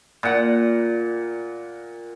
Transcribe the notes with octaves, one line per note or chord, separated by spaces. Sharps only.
A#2 F#5